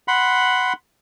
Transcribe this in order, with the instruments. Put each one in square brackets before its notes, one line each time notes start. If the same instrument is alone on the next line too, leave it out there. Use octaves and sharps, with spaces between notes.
[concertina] F#5 B5 C6